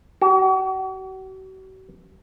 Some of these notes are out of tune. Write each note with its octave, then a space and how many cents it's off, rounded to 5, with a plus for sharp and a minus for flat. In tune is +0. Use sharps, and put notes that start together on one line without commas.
F#4 +45